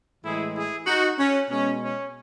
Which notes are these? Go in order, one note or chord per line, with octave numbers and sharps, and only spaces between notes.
A2 E3 G#3 E4 G#4
E4 G#4
D#4 F#4
C#4
B2 G#3 C#4
C#4